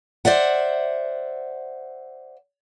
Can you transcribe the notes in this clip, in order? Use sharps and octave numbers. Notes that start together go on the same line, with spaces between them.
C5 D5 E5 F#5